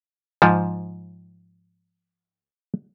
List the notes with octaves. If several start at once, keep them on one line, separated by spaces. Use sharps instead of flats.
G#2 F3